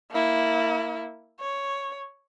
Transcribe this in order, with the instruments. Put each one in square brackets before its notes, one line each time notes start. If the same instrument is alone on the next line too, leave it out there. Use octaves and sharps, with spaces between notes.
[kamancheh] A#3 E4
C#5